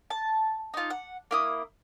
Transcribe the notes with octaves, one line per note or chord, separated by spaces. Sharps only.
A5
D#4 F4
F#5
A#3 E4 D#6